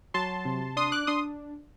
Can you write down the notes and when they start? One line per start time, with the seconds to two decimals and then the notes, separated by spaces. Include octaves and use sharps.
0.14 F#3 A5 C6
0.45 C3
0.77 D4 C6 D#6
0.92 D6 F#6
1.07 D4 C6 D#6